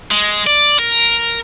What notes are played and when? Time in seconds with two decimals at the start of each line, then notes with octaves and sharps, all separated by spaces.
0.11 G#3
0.46 D5
0.79 A#4